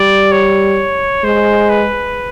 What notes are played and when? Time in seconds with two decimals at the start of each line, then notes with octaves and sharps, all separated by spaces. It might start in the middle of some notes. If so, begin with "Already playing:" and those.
Already playing: G3 D5
0.32 C#5
1.23 G#3 C5
1.70 B4